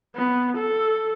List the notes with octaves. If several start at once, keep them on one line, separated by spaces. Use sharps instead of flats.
B3
A4